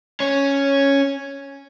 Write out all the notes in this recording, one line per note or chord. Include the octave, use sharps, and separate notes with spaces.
C#4